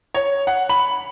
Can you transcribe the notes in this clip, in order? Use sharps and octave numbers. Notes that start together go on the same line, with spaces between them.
C#5
F#5
B5 F#7